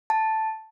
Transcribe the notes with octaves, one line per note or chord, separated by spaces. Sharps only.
A5